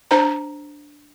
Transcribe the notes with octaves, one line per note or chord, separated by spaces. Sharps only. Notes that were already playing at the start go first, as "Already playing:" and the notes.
D4 C5 A#5